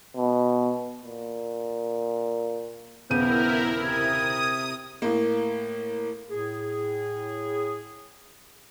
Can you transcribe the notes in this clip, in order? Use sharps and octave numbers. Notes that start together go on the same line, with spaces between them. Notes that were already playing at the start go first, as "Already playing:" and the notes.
B2
A#2
D#1 C#3 B3 E4 A#4 G6 D#7
C3 D#6 G#6
A2 A#3
A2 G#4